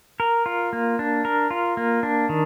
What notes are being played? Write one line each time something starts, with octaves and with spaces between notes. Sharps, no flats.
A#4
F4
A#3
D4
A#4
F4
A#3
D4
D#3